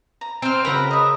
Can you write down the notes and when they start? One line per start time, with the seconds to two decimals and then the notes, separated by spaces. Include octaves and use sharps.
0.21 A#5
0.42 C4 C5 G5 F6
0.65 C#3 F#4 A#4 B4 B5 A#6
0.91 D#5 E5